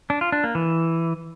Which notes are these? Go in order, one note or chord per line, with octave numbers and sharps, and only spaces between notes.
D4
F4
D4
A#3
E3